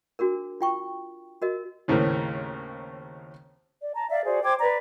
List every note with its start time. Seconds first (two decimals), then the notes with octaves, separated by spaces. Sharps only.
0.19 D4 F#4 G#4 A#4
0.61 F4 G5 C#6
1.42 F#4 A#4 D#5
1.88 D#2 A2 C#3 C4 A#4
3.81 D5
3.95 A5 A#5
4.10 D5 E5 F5
4.25 F#4 G#4 C5 D5
4.43 C5 G5 D6 G#6
4.60 B4 D5 A#5